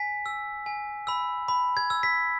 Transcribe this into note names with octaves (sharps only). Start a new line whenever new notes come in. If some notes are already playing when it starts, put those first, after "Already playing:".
Already playing: G#5 B6
E6
G#5
B5 E6
B5
G#6
E6
B6